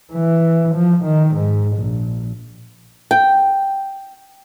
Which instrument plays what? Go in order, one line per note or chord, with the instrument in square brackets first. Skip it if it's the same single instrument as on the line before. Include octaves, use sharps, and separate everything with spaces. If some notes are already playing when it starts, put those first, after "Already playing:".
[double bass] E3
F3
D#3
G#2
A#1
[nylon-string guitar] G5